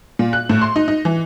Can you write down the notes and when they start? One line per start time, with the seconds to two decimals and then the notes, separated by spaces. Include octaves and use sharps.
0.19 A#2
0.33 F#6
0.49 A2
0.62 C6
0.76 D#4
0.88 D#4
1.05 E3